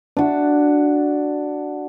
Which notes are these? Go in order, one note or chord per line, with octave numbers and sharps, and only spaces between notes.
D4 F#4